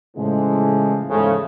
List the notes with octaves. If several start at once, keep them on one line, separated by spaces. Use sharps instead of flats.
A2 C#3 E3 F3 G#3
E2 G#2 C#3 F3 G#3 A3